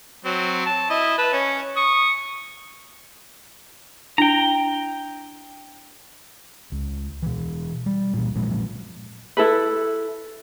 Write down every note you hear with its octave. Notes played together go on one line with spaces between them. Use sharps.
F#3 C4
A5
E4 D#5
B4 A5 B5
C#4
C#6 D#6
D4 E4 G5 A#5
C#2
B2 E3
G3
A#2 E3
A#2 F3 F#3 G#3
E4 A4 B4